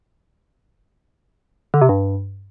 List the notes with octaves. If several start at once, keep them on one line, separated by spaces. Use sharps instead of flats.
D3
C3
G2